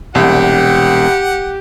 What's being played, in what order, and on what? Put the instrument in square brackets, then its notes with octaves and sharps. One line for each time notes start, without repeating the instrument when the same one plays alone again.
[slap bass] E1 [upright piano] C2 [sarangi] G4 [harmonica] F#5